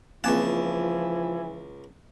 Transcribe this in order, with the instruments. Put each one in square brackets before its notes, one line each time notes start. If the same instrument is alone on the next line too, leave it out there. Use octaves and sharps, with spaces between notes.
[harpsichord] C#2 A5 [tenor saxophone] E3 [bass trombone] F3 [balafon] A#3 C4 D6